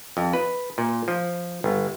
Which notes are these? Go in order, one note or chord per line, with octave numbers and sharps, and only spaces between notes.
F2
B4
A#2
F3
G1